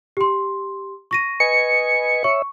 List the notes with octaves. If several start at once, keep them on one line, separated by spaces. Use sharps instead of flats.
G4 C6
C#6 A#6 D#7
B4 D#5 G#5 C#7
C#5 E5 C#6